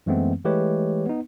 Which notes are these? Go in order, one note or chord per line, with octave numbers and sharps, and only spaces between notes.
F#2 E3 G#3 A3 B3 C4
E3 G#3 A3 G4 B4 C#5
B3 D#4